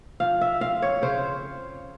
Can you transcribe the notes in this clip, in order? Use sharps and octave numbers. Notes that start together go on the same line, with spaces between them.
F3 F5
E5
C4 F5
C#5
C#3 C5